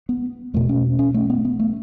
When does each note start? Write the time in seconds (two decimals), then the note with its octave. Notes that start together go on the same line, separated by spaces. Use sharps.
0.09 B3
0.54 E2 B2 A3
0.69 C#4
0.99 C#4
1.14 A3
1.30 B3
1.45 B3
1.59 A3